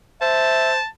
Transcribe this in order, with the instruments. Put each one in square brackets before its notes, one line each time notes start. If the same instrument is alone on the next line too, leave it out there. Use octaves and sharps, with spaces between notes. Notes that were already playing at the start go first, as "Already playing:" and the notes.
[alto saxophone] C5 [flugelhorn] E5 [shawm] A5